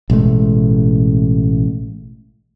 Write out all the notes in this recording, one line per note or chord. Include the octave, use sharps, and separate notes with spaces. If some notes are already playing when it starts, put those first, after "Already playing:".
A1 B2 G#3 A3